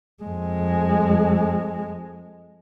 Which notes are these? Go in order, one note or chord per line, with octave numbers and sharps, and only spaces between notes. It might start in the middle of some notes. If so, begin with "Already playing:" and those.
F2 G#3